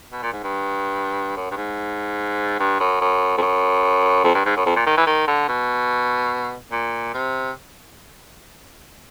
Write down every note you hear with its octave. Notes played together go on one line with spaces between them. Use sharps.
B2
A#2
G#2
G2
F#2
G2
G#2
G2
F#2
F#2
F2
F#2
F2
G2
G#2
F#2
F2
A#2
D#3
E3
D#3
D3
B2
A#2
C3